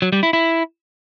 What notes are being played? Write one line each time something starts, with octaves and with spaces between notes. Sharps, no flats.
F#3
G3
E4
E4